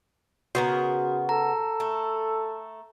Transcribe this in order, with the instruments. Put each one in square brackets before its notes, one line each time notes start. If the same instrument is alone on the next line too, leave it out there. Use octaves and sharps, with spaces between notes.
[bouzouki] C#3 B3 A#4 [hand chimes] F#4
[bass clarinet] A4 [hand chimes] A#5
[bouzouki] A3